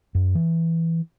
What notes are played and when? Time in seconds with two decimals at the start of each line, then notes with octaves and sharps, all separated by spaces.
0.15 F#2
0.35 E3